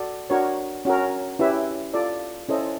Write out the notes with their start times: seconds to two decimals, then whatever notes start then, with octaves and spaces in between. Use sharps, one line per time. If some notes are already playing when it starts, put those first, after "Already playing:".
Already playing: F#4 A4 D5
0.30 D4 F#4 A#4 C#5
0.85 C#4 F#4 A#4
1.39 C#4 E4 G4 B4 E5
1.94 F4 A4 D5
2.49 C#4 E4 A4 C5 D#5